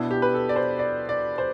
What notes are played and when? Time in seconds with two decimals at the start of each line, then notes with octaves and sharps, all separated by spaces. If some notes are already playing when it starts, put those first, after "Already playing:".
Already playing: B2 B3 D4 E4
0.11 G4
0.22 B4
0.34 A4
0.49 D5
0.56 C5
0.79 D5
1.09 D5
1.38 C5